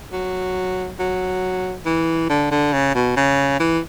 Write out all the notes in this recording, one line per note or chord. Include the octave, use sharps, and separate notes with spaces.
F#3
F#3
E3
D3
D3
C#3
B2
C#3
E3